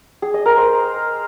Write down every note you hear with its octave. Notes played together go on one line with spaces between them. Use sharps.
G#4
D#5
A#4
C5